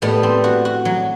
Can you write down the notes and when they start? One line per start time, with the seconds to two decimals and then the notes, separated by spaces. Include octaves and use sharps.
0.02 A2 G3 B3
0.23 C4
0.44 F#4
0.65 F#4
0.85 F#3